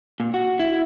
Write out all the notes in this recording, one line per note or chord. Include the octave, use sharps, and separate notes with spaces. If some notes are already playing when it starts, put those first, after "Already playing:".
A#2
F#4
E4